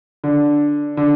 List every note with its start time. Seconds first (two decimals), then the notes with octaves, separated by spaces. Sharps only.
0.24 D3
0.97 D3